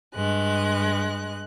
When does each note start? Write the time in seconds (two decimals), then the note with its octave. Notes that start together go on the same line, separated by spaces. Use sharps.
0.14 G2 G#3 F#6